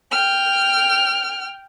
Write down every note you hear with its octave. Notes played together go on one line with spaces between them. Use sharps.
G5 F6